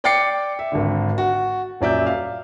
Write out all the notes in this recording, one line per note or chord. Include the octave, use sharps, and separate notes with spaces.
D5 G5 D6 A6 C7 C#7
E5
G#1 D3
F#4
D#1 F#2 D5 E5 G6
F5